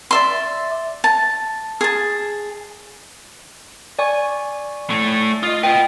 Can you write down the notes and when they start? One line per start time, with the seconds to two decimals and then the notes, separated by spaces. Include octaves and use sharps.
0.11 D5 E5 C6
1.04 A5
1.81 G#4 A5
3.99 D5 G#5 C#6
4.90 A2 A3
5.43 F4 D#5 D#6
5.63 B4 D#5 G5